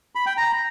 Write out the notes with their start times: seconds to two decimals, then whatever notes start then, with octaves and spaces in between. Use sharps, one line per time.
0.15 B5
0.26 G5
0.37 A#5